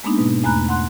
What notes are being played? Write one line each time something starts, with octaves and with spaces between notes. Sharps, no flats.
G#3 A#3 B3 D4 D#4
G#2 B2
E2 A3 G#5 A#5 B5 F#6
F#5 C6 F#6